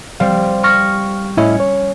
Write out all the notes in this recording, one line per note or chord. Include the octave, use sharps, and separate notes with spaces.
G3 C4 F5
C#6 F6 A#6
A2 C#4 E4 D#5
C#5